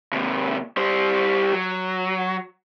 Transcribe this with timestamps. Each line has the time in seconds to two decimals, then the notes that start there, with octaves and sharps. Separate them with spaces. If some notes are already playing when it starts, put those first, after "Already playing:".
0.12 D#2 C3
0.77 G3 C5
1.53 F#3